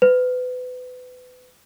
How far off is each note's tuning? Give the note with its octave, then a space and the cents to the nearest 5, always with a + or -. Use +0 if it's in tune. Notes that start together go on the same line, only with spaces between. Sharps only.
B4 +30